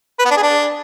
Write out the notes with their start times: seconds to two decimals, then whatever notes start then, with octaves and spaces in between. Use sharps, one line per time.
0.19 B4
0.25 B3
0.31 D4
0.37 G#4
0.43 D4